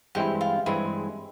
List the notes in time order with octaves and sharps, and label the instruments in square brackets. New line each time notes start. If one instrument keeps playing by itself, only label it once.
[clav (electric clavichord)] G2 E3 G#3 C4 E4 [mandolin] G4
[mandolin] F4
[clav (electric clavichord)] G2 E3 G#3 C4 E4 [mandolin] G#4